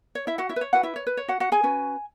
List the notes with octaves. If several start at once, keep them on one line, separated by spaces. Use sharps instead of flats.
C#5
E4 E5
F#4 F#5
E4 E5
B4
C#5
E4 F#4 B4 F#5
E4 E5
C#5
B4
C#5
F#4 F#5
F#4 F#5
G#4 G#5
C#4 F#4 B4